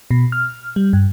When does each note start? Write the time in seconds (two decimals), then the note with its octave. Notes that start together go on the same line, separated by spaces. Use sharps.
0.11 B2
0.32 F6
0.76 G3
0.93 G2